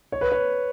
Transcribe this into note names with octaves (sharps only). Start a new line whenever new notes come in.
C#5
B4
C#5